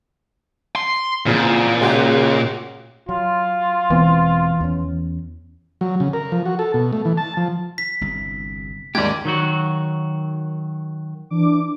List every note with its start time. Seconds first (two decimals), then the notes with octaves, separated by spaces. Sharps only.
0.76 C6
1.26 A1 F2 A#2 C#3
1.81 C#3 G#3 F#4 G4
3.09 F#3 F4
3.90 E1 E3 B3 C4
4.61 E2 C#4
5.81 F#3
6.00 C#3
6.13 A#4
6.32 F3
6.46 F#4
6.59 A4
6.74 B2
6.93 A3
7.05 E3
7.17 A5
7.37 F3
7.78 B6
8.01 G1 C2
8.95 D#2 G#2 G4 D5 G#6
9.25 D#3 F#3 F#4
11.30 E3 D4 D6